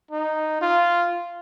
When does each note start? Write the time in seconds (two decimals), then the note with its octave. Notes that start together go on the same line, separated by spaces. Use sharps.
0.11 D#4
0.61 F4